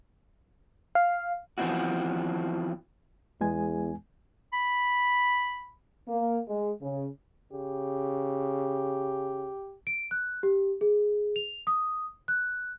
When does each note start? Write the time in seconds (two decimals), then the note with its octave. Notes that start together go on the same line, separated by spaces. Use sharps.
0.95 F5
1.58 E3 F3 B3 C4 E4 F#4
3.41 E2 G#3 B3 G#5
4.53 B5
6.08 A#3
6.48 G#3
6.82 C#3
7.52 C#3 G4
9.87 D7
10.11 F#6
10.43 G4
10.81 G#4
11.36 F7
11.67 D#6
12.28 F#6